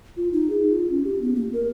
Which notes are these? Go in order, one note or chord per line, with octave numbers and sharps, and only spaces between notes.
F4
D#4
G#4
F4
C#4
G4
B3
A#3
A#4